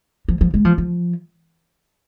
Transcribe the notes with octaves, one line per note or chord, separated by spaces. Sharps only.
F3
F3
G#3
F3
F3